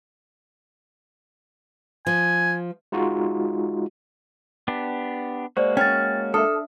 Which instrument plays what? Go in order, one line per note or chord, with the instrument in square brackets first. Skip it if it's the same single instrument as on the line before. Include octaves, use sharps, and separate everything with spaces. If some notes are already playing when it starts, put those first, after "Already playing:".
[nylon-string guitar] F3 [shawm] G#5
[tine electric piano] G#3 D#4 F4 F#4
[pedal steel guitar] B3 D4 G4
[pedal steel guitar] G#3 A#3 F#4 [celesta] C5 D5
[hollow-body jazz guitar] C#4 [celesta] G5 A6 [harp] F6
[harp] D4 E5 [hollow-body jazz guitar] A4 [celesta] D#6 F6